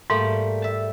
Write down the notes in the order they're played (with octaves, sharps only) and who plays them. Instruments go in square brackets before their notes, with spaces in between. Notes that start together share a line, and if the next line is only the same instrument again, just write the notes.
[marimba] G#2 [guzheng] G3 A3 A#3
[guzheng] E5 A5